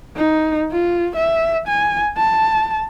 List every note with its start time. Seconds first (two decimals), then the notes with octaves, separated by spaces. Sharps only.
0.17 D#4
0.72 F4
1.16 E5
1.68 G#5
2.17 A5